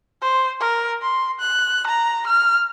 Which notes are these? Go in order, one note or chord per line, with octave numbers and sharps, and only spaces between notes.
C5
A#4
C6
F#6
A#5
F6